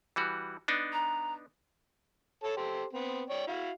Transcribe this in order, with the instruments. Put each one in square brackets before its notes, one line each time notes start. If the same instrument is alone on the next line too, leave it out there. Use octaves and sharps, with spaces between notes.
[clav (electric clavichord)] E3 G3 F#4
B3 D4 D#4
[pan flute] A#5
[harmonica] A4 C#5 A5
G4 A4 C5
B3 C4
C#5 D5 G5
E4 F#4 F5